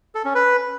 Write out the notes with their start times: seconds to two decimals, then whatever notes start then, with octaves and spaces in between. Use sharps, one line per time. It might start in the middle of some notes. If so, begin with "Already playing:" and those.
0.15 A4
0.25 C#4
0.35 B4